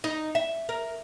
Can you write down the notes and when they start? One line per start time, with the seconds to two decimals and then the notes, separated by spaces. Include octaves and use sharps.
0.04 D#4
0.35 E5
0.69 A#4